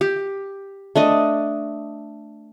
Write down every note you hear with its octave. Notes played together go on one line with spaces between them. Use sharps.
G4
A3 D4 D#5